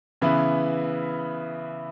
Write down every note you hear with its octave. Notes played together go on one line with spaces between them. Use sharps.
C#3 E3 B3 E4 B4